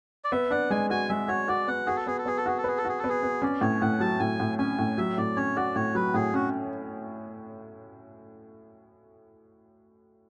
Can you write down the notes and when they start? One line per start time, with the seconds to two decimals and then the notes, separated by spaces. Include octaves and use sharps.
0.24 D5
0.32 B3 E5
0.51 D4 F#5
0.70 G#3 G#5
0.90 F#4 G#5
1.09 G#3 E5
1.28 F#4 C#5
1.48 F#4 D5
1.68 B3 F#5
1.86 F#4 G#4
1.97 A4
2.07 B3 G#4
2.18 A4
2.26 B3 G#4
2.37 A4
2.46 F#4 G#4
2.58 A4
2.64 G#4 B4
2.78 A4
2.85 F#4 G#4
2.99 B3 A4
3.09 G#4
3.23 B3
3.42 C#4 D5
3.61 A2 C#5
3.82 A2 F#5
4.00 F#3 A5
4.20 A2 G#5
4.40 A2
4.59 C#4 G#5
4.79 A2
4.98 F#3 E5
5.18 A2 D5
5.36 C#4 C#5
5.56 F#4 D5
5.75 A2 C#5
5.95 F#3 B4
6.14 A2 G#4
6.34 C#4 F#4